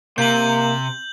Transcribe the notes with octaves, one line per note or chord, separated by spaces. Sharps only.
C3 A#3 G6 F#7